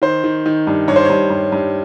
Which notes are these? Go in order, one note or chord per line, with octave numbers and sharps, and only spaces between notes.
D#3 C5
D#3
D#3
G2
G2 C#5
C5
G2 C#5
G2
G2